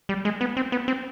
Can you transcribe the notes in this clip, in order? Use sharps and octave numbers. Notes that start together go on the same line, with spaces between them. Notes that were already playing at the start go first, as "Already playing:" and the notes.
G3
G#3
B3
C4
B3
C4